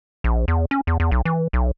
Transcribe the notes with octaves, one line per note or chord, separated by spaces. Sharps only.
A#1
E2
C#4
E2
E2
B1
E3
B1